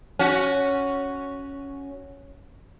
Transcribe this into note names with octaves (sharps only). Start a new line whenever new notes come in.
C#4 F#4